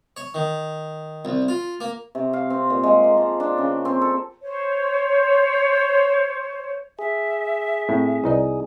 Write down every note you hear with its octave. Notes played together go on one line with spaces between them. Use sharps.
C#5
D#3
C2
F4
A#3
C3
F5
C4
A#2
G#3
A#3
F3
D4
C#3
C4
A4
C5 C#5
G#4 E5
A2 C4
C2 D#4 E4 B4 D5 D#5